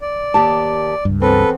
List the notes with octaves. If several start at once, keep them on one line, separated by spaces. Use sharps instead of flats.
D5
D#2 G4 A5
C#2 G2
E2 C4 A4 B4